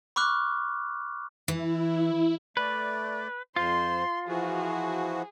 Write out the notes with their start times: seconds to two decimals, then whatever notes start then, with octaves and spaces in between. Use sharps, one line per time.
0.16 B5 C#6 D6 F6 F#6
1.48 E3 E4
2.57 A3 B4 D5
3.56 F2 F4 C5 C6
4.28 E3 F3 F#4 G#4